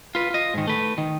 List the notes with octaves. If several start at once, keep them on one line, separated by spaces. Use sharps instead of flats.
F4 B4
F4 D#5
G#2 D#3
A3 B4
D#3